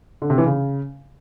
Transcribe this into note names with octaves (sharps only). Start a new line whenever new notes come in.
D3
C3
E3
C#3